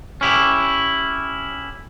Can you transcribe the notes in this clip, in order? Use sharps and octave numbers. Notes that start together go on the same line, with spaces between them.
C#4 E4 G4